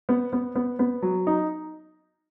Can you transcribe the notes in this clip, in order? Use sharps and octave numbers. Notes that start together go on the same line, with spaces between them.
B3
B3
B3
B3
F#3
D#4